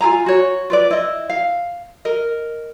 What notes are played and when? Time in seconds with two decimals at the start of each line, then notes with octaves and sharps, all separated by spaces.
0.01 F4 G#4 G#5 A#5
0.26 F#4 C#5
0.70 F4 B4 D5
0.91 E4 D#5
1.29 F5
2.05 A#4 D#5